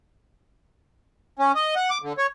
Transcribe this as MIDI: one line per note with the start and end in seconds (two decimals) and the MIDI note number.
1.39 1.52 61
1.55 1.75 75
1.76 1.90 78
1.90 1.98 86
2.02 2.13 50
2.18 2.27 73